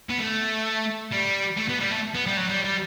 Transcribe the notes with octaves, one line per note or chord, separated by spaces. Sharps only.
B3
A3
G3
A3
B3
G3
A3
B3
G3
F#3
G3
G3